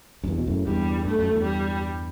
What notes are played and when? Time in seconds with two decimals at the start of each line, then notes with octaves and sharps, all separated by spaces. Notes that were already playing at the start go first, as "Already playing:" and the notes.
0.24 F#2
0.28 E2 G2
0.39 B2
0.47 F#2 A2
0.66 E2 G2 G3
1.05 G2 A3
1.19 F#2
1.32 E2 G2
1.44 G3